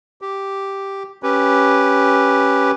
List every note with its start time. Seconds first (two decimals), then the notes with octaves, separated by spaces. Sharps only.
0.21 G4
1.23 C#4 G4 B4